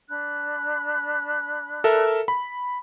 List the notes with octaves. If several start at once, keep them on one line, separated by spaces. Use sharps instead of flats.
D4 B5 F#6
A4 A#4 E5
B5